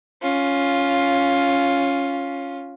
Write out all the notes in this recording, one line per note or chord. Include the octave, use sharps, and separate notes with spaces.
C#4 F4